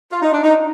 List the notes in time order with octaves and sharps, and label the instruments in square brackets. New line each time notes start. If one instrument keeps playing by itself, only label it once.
[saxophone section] F4
D#4
D4
D#4